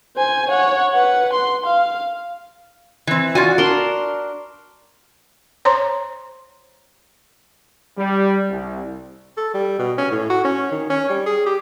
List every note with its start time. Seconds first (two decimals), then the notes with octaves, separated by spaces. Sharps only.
0.17 C5 G#5
0.49 C#5 F#5
0.94 B4 F#5
1.33 C6
1.66 F5
3.07 E3 C4
3.35 F4 F#4 D5 G#5
3.58 D4 A#4 C6
5.65 C5 C#5 A#5 C6
7.97 G3
8.50 C2
9.37 A4
9.54 G3
9.79 B2
9.98 C#4
10.11 A2
10.30 F#4
10.45 C#4
10.72 D#3
10.90 C#4
11.09 G3
11.26 G#4
11.46 G4